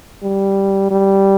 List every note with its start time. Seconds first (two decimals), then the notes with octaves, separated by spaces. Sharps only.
0.23 G3
0.91 G3